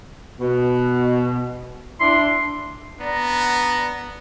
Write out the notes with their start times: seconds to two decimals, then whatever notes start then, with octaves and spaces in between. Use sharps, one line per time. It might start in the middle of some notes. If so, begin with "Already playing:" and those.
0.39 B2
2.00 D4 E4 C6
3.01 B3 D4 D5 A#5